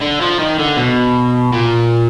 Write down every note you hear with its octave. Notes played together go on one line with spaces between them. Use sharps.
D3
F3
D#3
D3
B2
A#2